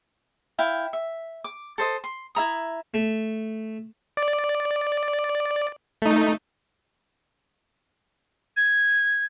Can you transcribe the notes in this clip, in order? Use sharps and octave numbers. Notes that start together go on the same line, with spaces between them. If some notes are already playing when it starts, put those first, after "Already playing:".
E4 F5 G5
E5
D6
A4 C5 D#5
C6
E4 E5 A#5 D#6
A3
D5
A3 D#4
G#6